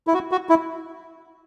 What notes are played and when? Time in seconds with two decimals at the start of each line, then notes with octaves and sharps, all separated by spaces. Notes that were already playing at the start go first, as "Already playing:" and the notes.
0.07 E4
0.14 F#4
0.31 F#4
0.49 E4